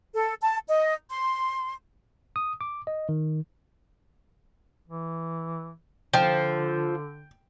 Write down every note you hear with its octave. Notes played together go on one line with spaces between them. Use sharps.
A4
A5
D#5
C6
D#6
D6
D#5
D#3
E3
D3 F3 G5